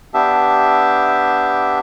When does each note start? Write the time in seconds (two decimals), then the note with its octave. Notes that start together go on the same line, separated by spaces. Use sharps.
0.14 B3 D4 G4 E5